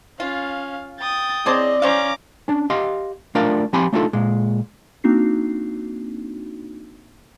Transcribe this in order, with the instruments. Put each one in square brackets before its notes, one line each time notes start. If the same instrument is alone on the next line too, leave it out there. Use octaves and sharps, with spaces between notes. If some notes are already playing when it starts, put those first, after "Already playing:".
[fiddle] C#4 [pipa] F4 [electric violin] F5
[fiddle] G5 D#6 [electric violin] A6
[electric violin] C4 D#5 [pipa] G#4 C5 A5 [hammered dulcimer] D5
[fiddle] C#4 [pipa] C5 F5 [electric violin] A#5 D6
[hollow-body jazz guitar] C#4 D4
G4 D#5 F5 C6
A3 D4 F4 A#4 D5 F5
F3 C4 G4 G#5 B5 C6
A3 D4 D#4 F4 A4
A#2 G#3
[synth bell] A#3 C4 D4 D#4 F#4 C7